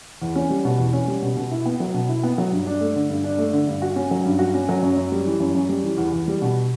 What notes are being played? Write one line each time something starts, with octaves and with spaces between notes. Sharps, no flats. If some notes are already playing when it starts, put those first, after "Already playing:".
E2
C#4
G3
B2
E2
C#4
G3
B2
B2
E4
B3
F#3
B2
E4
B3
F#3
G2
D4
A3
D3
G2
D4
A3
D3
G2
F#4
C#4
F#3
G2
F#4
C#4
F#3
F#2
F#2
G3
E3
F#2
F#2
G3
E3
E2
E2
G3
B2